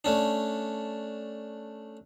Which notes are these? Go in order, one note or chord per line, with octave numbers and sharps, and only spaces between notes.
A3 C#4 D4